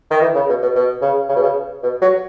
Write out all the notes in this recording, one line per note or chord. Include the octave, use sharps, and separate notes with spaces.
D#3
E3
C#3
B2
B2
B2
C#3
C#3
B2
C#3
B2
F#3